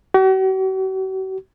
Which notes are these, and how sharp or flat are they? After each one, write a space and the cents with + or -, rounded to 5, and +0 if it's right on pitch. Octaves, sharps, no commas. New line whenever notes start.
F#4 +45